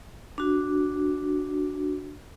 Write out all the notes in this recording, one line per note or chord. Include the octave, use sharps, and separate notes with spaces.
D4 F#4